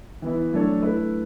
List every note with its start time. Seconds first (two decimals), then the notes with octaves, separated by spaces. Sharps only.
0.22 E3 B3 E4
0.52 F#3 A3 D4 A4 C#5
0.82 A3 E4 B4